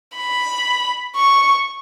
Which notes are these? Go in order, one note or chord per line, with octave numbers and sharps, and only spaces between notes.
B5
C#6